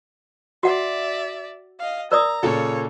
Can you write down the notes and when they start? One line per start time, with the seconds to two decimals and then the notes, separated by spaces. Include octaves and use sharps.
0.63 F#4 D5 E5 F#5
1.79 D#5 F5
2.12 A#4 D5 A#5 D#6
2.43 A#2 C#3 A4 C#5